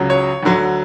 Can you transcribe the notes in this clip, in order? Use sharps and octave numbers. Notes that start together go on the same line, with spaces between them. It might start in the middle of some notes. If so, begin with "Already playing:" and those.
Already playing: C#2 C#3 F#3
C#5
D2 D3 F#3